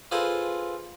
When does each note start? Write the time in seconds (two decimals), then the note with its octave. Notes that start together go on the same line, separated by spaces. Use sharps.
0.11 F4 G#4 A4 B4 C5 D#5